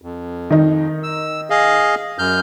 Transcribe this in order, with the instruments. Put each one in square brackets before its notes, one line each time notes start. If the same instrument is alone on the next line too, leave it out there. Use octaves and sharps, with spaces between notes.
[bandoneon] F2
[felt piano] D#3 D#4
[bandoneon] E6
G#4 D#5 F5
F#2 F6 G6